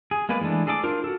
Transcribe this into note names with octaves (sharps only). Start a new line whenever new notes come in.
G#4
G#3 A#3 B3 B4 D5
E3 G#3 A3 D4
G#4 A4 D5 D#5 D6
D4 F4 A#4 C5
F#4 A4